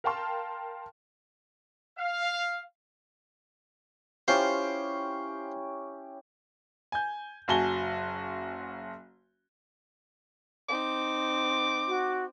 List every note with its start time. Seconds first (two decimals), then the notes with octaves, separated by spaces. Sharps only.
0.04 A#4 F5 G5 A5 C6 F6
1.98 F5
4.28 C#4 E4 F4 G4 C5
6.92 G#5 G6
7.48 F#1 F#3 F#4 G#5 A5 G7
10.69 C4 D#4 D6
11.87 F#4